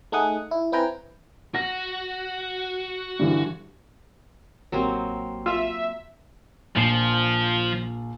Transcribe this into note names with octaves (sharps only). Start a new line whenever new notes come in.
A3 D#4 G#4 F#5 D#6
E4
C4 E4 B4 G5 G#5 A#5
F#4 A#6
G2 D3 E3
A1 F#3 A#3 C4 G4
F4 E5
A#1 F3 C7